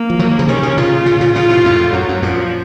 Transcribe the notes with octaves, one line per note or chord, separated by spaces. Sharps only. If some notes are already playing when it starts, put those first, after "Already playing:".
Already playing: A#3
F3
D#3 F#3
C#3 F3
C3 D#3 C#4
C3 D#3
A#2 C#3 F4
A#2 C#3
A#2 C#3
A#2 C#3 F4
A2 C3
F2 A2
F#2 F#3
F#2
F#2 A#2 F3